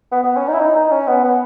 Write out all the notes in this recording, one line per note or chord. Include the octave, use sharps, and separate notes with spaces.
B3
B3
C#4
D#4
E4
D#4
D#4
C#4
B3
B3